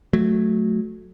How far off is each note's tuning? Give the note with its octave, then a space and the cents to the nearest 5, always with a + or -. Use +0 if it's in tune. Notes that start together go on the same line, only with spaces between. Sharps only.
F#3 -10 A3 -10